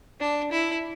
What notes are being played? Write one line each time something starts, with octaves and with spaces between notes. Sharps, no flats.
D4
E4